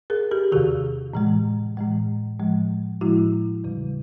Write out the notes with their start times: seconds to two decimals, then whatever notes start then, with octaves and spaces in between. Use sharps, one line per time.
0.10 G#4 A#4
0.31 G4 A4
0.52 E2 C3 D#3 F#4 G#4
1.14 A2 E3 G#3
1.77 A2 E3 G#3
2.39 A2 F3 G#3
3.01 A2 F3 G#3 E4 F#4
3.64 E2 C#3 E3 G3